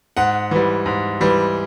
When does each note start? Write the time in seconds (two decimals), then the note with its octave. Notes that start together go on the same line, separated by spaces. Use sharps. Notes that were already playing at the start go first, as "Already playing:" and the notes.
0.17 G#2 F#5
0.51 E3 G3
0.86 G#2
1.21 E3 G3